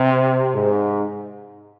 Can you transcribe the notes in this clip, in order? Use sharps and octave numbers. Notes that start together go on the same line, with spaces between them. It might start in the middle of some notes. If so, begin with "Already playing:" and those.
Already playing: C3
G#2